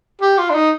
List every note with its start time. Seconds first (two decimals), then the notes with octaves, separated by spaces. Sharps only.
0.21 G4
0.38 F4
0.50 D4
0.55 D#4